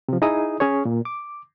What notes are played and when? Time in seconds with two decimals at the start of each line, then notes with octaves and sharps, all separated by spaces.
0.08 C3 F3
0.22 D#4 E4 G#4 D#6
0.60 C#4 G#4 C#5
0.85 A#2
1.05 D6